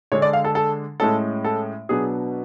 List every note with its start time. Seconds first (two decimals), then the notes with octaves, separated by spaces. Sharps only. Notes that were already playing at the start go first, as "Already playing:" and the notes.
0.12 D3 G#3 D4 C#5
0.22 D5
0.33 F5
0.44 A4
0.55 A4
1.00 A2 G#3 C#4 A4
1.44 A4
1.89 B2 F#3 B3 D4 G#4